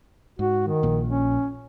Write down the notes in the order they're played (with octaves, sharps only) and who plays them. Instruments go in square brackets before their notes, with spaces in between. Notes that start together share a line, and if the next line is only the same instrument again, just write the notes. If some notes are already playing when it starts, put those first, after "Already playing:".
[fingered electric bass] G#2 [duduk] F#4
[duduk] D#3
[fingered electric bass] A#1 A#2
[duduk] C#4